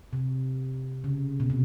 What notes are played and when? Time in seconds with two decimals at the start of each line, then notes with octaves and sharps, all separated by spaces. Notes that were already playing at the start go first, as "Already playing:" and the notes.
0.13 C3
1.04 C#3
1.40 B2
1.50 C3